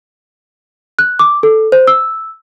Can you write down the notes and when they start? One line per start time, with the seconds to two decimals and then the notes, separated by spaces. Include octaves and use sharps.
0.99 F#6
1.19 D6
1.43 A4
1.72 C5
1.87 E6